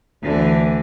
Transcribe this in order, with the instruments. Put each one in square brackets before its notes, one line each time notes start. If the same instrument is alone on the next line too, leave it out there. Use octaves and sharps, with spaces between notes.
[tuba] D2 [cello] D3 E3